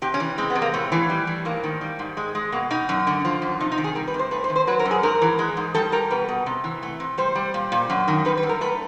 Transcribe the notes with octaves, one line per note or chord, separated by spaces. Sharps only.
C3 G4
C#4
E3
G#3 C4
B3
C3
A#3
A2 A3
E3
G3
A2
G#2 A#3
D#3
G3
G#2
G#3
G#3
B2 A#3
B2 D#4
F#2
D3
F3
F#2
C3 D#4
D#4
D#3
G#4
G3 A#4
B4
C3
C5
A3 B4
C5
D#3
C5
F#3 B4
A#4
F#2
G#4
G#2 A#4
E3
G#3
G#2
G3 A4
G3 A#4
B2 B4
B2
C3
E3
A3
C3
G3 C5
G3
A#2
A#2
F#2
D#3
G3 B4
B4
F#2
A#4
A3 B4